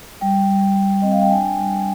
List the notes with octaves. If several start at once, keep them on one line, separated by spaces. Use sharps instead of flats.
G3 G5
G3
G3
C4 D#5
F5
G5
D4 G#5
G3